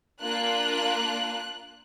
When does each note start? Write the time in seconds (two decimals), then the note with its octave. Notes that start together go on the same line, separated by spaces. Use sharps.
0.22 A#3 D4 F4 F#6